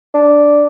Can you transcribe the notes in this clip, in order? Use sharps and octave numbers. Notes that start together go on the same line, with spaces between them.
D4